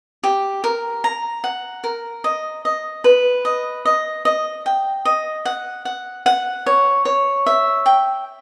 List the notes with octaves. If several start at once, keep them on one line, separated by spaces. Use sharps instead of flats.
G4
A#4
A#5
F#5
A#4
D#5
D#5
B4
D#5
D#5
D#5
G5
D#5
F#5
F#5
F#5
C#5
C#5
E5
G5